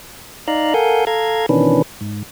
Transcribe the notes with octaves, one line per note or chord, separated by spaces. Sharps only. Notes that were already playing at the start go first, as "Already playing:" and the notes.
D#4 D5 F5 A#5 F#6
A4 A#4 F5 F#5 G#5 G6
A4 F5 A#5 G#6
B2 D#3 E3 C#4 D4 B4
G#2